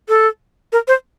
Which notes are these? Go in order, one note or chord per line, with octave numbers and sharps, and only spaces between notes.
A4
A#4
C5